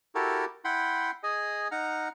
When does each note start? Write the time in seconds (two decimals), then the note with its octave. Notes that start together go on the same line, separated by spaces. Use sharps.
0.15 E4 F#4 G4 A4 A#4
0.65 E4 F#5 G5 B5 C6
1.23 G#4 D#5 G#5
1.72 D#4 F#5 A#5 F6